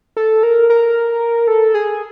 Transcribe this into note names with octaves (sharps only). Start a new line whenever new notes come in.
A4
A#4
A#4
A4
G#4